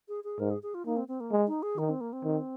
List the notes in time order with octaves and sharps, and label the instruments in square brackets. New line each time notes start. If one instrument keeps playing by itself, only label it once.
[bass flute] G#4
G#4
[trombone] G#2 [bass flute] A#4
[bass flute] G#4
G#4
F4
[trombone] A#3 [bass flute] D#4
[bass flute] C4
C4
A#3
[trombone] G#3
[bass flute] D#4
G#4
[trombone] D#3 [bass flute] D#4
[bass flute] C4
A#3
C4
[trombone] D#3